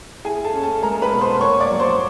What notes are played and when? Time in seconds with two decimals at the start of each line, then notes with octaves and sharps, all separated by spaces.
0.25 E4 G#4 G#5
0.44 A4 A5
0.53 C#4
0.63 A4 A5
0.83 G#3 A#4 A#5
1.02 B4 B5
1.12 B2
1.21 C5 C6
1.41 A#3 C#5 C#6
1.60 D5 D6
1.70 F#3
1.79 C5 C6